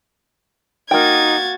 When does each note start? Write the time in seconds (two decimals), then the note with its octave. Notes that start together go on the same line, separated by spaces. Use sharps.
0.91 A#3 D#4 F#4 G5 G#6 A6